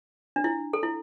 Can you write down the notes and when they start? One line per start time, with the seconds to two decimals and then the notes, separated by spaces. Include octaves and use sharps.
0.36 D4
0.44 E4
0.73 A4
0.83 E4